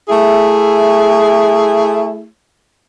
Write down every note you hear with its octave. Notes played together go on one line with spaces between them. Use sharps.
A3 E4 G#4